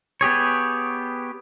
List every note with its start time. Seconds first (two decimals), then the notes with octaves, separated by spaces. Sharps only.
0.21 B3 G4 G#4 C#5